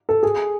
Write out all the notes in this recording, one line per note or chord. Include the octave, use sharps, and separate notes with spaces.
A4
G#4